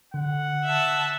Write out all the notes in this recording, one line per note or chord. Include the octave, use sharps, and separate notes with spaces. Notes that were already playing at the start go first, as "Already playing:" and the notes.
D3 F#5
E5 A5